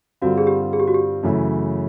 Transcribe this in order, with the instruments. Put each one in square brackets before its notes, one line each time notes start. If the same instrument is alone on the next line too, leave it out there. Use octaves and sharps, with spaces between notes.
[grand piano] G2 D3 G3 C4 F4 [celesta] F#4
[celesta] G#4
G4
G#4
G4
F#4
G4
[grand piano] F#2 C#3 E3 A3